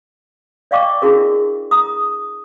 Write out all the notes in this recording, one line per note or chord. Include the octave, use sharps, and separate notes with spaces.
D5 D#5 F5 G5 C#6 D6
D4 E4 F#4 G#4 A#4
A#5 D#6